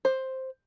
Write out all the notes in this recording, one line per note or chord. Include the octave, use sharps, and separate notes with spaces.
C5